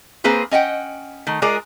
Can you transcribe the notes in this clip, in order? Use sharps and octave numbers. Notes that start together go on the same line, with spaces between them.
A#3 C4 G#4 B4 C5
C#4 D#5 F#5 G5
D#3 A3
G#3 F4 G#4 A#4 D5